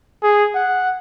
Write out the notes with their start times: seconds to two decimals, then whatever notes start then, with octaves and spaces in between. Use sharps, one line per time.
0.23 G#4
0.55 F#5